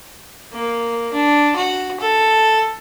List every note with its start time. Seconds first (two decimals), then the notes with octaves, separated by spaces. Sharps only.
0.53 A#3
1.13 D4
1.56 F#4
2.00 A4